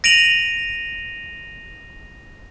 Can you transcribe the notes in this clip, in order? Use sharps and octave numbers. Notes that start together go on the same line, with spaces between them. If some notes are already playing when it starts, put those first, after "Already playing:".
A#6 D7 D#7 F7 F#7